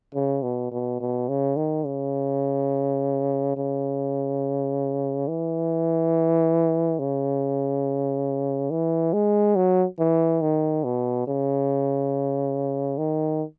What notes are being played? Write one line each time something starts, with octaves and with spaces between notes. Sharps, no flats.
C#3
B2
B2
B2
C#3
D#3
C#3
C#3
E3
C#3
E3
G#3
F#3
E3
D#3
B2
C#3
D#3